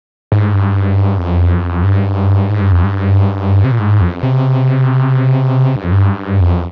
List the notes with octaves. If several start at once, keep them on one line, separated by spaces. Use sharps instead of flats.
G#2
G2
F2
G2
G#2
G2
F2
G2
C3
A#2
G#2
F2
C3
G2
F2
G2
F2